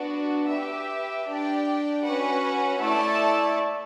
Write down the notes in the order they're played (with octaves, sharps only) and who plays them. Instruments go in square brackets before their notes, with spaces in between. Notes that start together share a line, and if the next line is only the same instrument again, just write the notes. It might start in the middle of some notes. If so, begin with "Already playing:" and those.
Already playing: [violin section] B3 D4 F#4
G4 B4 E5 G5
D4 G4 D5 G5
C#4 F#4 B4 F#5
A3 E4 A4 D5 A5